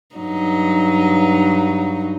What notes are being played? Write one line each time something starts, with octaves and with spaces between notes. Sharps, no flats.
G2 F#3 D#4